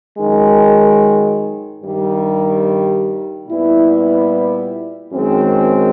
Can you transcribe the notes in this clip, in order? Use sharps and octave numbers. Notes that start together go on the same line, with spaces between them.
F#2 D#3 G#3
G2 D#3 G3
A#2 G3 B3 E4
F#2 D#3 G#3 C4